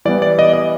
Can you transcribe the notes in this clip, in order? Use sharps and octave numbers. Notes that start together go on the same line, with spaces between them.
E3 G3 B3 D5
D5
D#5
D#5